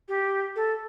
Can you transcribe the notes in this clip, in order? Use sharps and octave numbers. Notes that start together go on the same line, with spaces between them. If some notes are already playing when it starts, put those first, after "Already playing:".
G4
A4